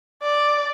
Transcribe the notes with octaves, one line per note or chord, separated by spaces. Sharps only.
D5